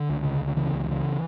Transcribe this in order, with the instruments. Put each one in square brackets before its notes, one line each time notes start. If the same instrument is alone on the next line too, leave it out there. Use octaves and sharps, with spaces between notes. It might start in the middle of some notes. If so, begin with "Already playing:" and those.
Already playing: [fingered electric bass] D3
C#2
C#3
C#2
C#3 E3
C#2
C#3